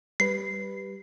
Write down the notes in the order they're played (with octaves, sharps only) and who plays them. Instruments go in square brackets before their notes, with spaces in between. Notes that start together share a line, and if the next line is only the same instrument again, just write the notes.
[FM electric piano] G3 B4 [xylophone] C7